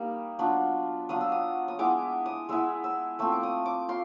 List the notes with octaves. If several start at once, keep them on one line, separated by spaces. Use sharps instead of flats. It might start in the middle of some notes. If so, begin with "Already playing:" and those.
Already playing: G3 A#3 D#4
F#3 B3 D4 F4
F#3 B3 D4 F4 D#6
E6
D#6
D#6
G#3 B3 E4 D6
D#6
G#3 B3 E4 E6
E6
A3 C4 F4 E6
D6
D#6
D6
F4 C6